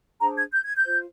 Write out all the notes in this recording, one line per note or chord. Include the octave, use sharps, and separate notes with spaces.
D4 G#4 C5 A#5
G#6
G6
G#6
G6
F4 C5